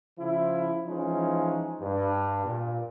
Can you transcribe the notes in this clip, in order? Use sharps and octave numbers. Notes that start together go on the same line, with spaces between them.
C#3 F3 E4
E3 F3 G#3 C#4 D#4
G2
A#2